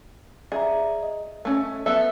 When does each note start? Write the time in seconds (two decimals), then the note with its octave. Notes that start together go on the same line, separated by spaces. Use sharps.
0.52 G#4 D5 E5 A#5
1.03 D#5
1.45 A3 C#4
1.86 B3 A4 E5